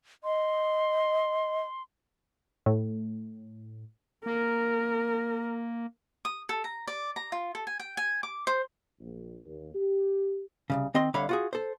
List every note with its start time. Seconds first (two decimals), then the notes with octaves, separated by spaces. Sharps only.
0.24 D#5 C6
2.66 A2
4.26 A#3 A#4
6.25 D#6
6.49 A4
6.64 A#5
6.87 D5
7.16 A#5
7.32 F4
7.55 A4
7.67 G#5
7.80 G5
7.97 G#5
8.23 D6
8.47 C5
9.00 A#1
9.45 D#2
9.74 G4
10.70 C2 F2 C#3
10.94 D#3 C4 D#5 C6
11.14 C2 D3 C#5 F5 B5
11.29 F4 F#4 G#4
11.53 A4 C5